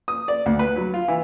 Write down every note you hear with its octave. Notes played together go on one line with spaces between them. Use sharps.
D#6
D5
D2
B4
F#3
F4
E3